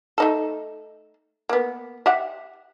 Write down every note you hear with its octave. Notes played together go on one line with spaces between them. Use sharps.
A3 D#4 A4
A#3 B3
G4 E5 F#5